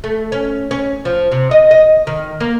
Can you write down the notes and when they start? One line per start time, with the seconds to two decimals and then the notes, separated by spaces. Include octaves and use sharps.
0.04 A3
0.32 C#4
0.71 C#4
1.05 F3
1.32 C3
1.51 D#5
1.71 D#5
2.07 D#3
2.40 A#3